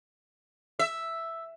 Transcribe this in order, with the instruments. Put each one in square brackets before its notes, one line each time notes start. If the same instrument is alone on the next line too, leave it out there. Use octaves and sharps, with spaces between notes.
[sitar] E5